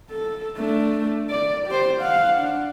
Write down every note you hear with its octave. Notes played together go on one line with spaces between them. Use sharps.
A4
A3 D4
D5
G4 C5
F5 F#5
D4